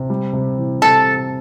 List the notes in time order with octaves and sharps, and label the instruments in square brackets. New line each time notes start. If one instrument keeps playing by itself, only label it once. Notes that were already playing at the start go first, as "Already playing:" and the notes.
Already playing: [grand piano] C3
G3
C3
E3
[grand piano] C3 [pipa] A4